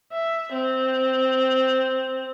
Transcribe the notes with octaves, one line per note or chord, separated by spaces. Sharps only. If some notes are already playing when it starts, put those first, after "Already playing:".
E5
C4